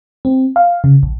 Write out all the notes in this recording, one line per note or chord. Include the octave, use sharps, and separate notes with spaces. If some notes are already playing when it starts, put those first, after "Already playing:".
C4
F5
C#3
A#1